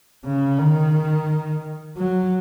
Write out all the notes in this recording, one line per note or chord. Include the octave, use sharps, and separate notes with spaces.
C#3
D#3
F#3